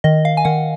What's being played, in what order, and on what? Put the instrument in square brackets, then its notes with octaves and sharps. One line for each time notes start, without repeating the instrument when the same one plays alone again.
[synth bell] D#3 D#5
F5
G#5
D#3 F#5